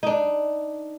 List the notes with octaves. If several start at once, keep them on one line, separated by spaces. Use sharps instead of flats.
D4 D#4